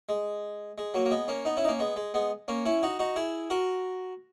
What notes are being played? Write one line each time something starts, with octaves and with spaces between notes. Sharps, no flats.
G#3
G#3
F#3 A#3
A#3
G#3 B3
A#3 C#4
B3 D#4
C#4 E4
D#4
A#3 C#4
G#3 B3
G#3
G#3 B3
A#3 C#4
C#4 E4
D#4 F#4
D#4 F#4
E4 G#4
F#4 A#4